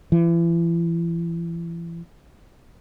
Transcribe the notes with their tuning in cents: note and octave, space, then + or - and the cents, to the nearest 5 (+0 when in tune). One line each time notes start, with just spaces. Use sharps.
E3 +35